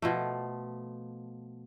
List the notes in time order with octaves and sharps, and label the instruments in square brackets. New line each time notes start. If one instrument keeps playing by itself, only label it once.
[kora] B2 F3 A3